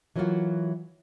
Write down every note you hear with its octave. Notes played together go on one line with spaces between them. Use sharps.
E3 F#3 A#3 D4 F4 F#4